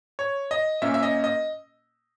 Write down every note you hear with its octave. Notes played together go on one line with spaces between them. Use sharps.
C#5
D#5
A#2 A#3 C#4 E5
E5
D#5
D#5